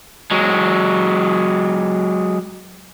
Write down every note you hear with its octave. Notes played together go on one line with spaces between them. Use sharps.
F#3 G#3